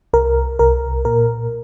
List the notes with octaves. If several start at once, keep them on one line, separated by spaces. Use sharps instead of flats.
C2 A#4
C2 A#4
A#2 A#4